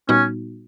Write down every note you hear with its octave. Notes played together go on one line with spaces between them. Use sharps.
A#2 G3 B3 C#4 D#4 F#4